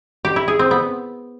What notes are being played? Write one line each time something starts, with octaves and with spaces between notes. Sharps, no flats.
G4
E4
G#4
C4
B3